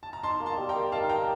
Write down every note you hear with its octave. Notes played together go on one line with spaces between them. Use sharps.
A5
A#5
D#4 A5 C6
A#3
A5 C6
G3
G5 A#5
A#4
D#4 F5 A5
A#3 G5 A#5